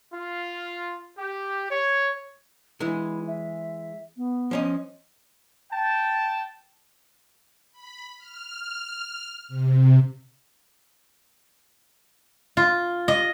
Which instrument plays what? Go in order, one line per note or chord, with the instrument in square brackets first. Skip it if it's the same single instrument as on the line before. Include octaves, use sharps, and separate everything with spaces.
[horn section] F4
G4
C#5
[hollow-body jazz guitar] E3 G#3 [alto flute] E4
[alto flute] E5
B3
[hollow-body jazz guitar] F3 C#4 D#5
[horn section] G5 A5
[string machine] B5
F6
C3
[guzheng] F4
D#5